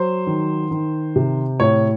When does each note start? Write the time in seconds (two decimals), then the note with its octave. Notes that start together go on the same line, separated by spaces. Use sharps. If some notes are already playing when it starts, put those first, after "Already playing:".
Already playing: F#3 C5
0.27 D#3
0.71 D#3
1.16 C3
1.60 A2 C#5